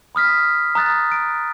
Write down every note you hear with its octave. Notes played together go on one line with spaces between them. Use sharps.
B5 D#6 F6 B6
A#5 D#6 F#6 A6
D7